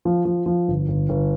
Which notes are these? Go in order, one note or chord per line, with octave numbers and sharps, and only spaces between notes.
F3
F3
F3
G1
G1
G1